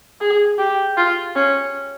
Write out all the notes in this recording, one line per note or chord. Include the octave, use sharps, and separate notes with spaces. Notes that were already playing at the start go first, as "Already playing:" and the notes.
G#4
G4
F4
C#4